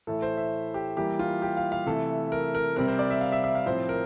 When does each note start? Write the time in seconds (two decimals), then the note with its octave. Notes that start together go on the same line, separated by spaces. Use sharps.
0.07 A2 E3 A3 A4
0.22 C5
0.37 E5
0.74 G4
0.97 E3 G3 A#3 G4
1.19 F4
1.42 G4
1.57 F5
1.72 F5
1.86 C3 E3 A3 A4
2.32 A#4
2.55 A#4
2.76 C3 G3 C4 A#4
2.88 C5
2.99 D5
3.10 E5
3.21 F5
3.32 E5
3.44 E5
3.55 F5
3.66 A2 F3 C4 C5
3.89 A#4